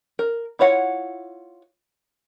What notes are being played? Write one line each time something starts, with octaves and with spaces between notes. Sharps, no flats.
A#4
E4 F4 C#5 F#5